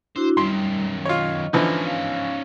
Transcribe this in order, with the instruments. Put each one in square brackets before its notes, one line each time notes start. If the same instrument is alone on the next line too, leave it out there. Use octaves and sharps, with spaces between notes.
[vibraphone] D4 E4 F#4 [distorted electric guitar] C5
[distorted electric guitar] F#2 D#3 [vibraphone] G3 [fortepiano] C6
[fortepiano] F4 C#5 [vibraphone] D#5
[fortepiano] D3 E3 F3 [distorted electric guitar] C#4 D#4
[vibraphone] F5